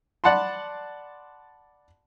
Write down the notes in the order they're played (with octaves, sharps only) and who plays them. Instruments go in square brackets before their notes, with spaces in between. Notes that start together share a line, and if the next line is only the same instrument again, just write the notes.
[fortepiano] D5 F#5 A5 B5 C6